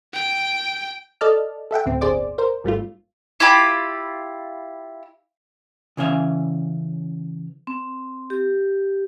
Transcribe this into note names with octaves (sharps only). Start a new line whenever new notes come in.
G5
A4 D5 D#5 A5 F6
A4 E5 F#5 G5
D2 A2 C4
G1 G#4 C5 D5 D6
A#4 C5
G#1 G3 A3 F4
E4 F4 G4 B5
C#3 E3 C#4 E5 F5
C4
G4